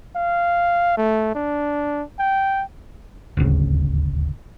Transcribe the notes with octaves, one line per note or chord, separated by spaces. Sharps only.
F5
A3
D4
G5
D#1 G#1 D2 C#3